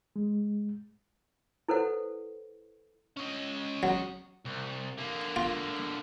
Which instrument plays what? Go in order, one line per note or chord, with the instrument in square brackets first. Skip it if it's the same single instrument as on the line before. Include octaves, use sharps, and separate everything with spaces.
[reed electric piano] G#3
[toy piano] E4 A4 B4 C5 F#5
[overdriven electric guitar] C#4 D#5
[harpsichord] F#3
[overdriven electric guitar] C2
D3 A#3
[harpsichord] F4